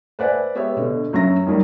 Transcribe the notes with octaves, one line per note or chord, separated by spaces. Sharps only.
B4 C5 D5 E5 F#5 G#5
G#3 B3 G4 C#5 E5
B2 D3
F#2 F#3 E5 A#6
D#3 F#3 G3 A#3